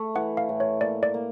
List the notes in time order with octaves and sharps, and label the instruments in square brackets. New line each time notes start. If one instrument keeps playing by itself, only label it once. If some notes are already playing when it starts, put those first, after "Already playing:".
Already playing: [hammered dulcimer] A3
[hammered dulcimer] E3 [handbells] F#5
[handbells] F5
[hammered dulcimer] A2
[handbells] C#5
[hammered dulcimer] A#3 [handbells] D5
[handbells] D5
[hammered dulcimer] A#3